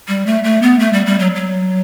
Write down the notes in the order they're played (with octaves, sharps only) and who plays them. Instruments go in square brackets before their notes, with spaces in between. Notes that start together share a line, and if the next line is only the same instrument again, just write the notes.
[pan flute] G3
A3
A3
B3
A3
G3
G3
F#3
F#3